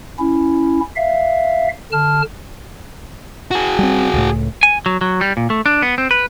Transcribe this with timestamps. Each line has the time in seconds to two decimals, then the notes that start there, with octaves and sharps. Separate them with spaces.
0.19 C#4 E4
0.96 E5 F5
1.92 D3 A5 F6
3.51 F#4 G#4
3.79 G3 C4
4.13 C#2 A2
4.63 G#5
4.86 F#3
5.01 F#3
5.21 G3
5.37 A#2
5.50 A3
5.66 D4
5.82 B3
5.98 C4
6.11 B4